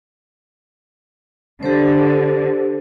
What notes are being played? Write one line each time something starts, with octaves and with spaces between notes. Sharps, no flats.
D3 G4 A4 C5